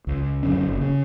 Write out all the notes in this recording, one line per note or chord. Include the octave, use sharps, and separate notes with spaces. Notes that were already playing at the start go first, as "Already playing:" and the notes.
C#2
F#2 D3 C#4
F#1
C#3